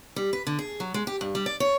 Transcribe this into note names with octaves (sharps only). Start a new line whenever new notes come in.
G3
B4
D3
G#4
F#3
G#3
G4
G2
G3
D5
C#5